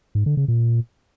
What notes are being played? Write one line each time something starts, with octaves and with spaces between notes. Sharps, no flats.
G#2
D3
C#3
A#2